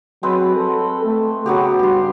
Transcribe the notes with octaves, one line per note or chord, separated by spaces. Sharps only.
F#3 G#3 C4 B4
A4
A3
C#3 F#3 B3 G4
G2 G4 C6